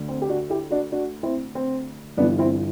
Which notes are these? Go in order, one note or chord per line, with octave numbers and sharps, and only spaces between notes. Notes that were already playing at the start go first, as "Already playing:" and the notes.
Already playing: D2 D3
C4
G4
D4 F#4
E4 G4
D4 F#4
D4 F#4
C4 E4
C4
G1 G2 E3 B3 D4
C4 E4